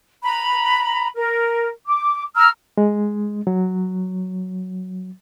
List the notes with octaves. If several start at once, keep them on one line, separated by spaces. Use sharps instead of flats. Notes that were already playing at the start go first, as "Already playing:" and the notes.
A#5 B5
A#4
D6
A#5 E6 F6
G#3
F#3